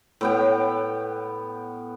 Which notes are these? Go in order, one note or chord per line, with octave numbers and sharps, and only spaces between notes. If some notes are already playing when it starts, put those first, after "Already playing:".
A2 B3 G5